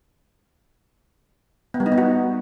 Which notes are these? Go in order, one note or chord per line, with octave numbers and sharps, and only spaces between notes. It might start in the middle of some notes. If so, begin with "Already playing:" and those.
B3
G3
D#4
B3
F#4